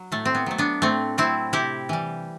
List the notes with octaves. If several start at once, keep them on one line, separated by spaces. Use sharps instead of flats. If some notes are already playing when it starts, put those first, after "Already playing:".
Already playing: F#3
A2 A3
C4
B3
F#3 A3
B3 D4
A2 A3 C4
F#3 A3 C4 E4
C3 E4 G4
E3 G3